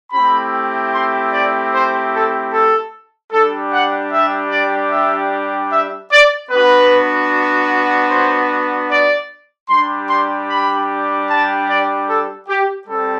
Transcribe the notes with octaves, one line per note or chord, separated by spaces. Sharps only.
A3 C4 E4 G4 B5
C6
D5
C5
A4
A4
G3 D4 G4 A4
F#5
E5
D5
E5
E5
D5
B3 D4 F#4 B4
C5
D5
G3 D4 G4 C6
C6
B5
A5
D5
A4
G4
G3 C4 A4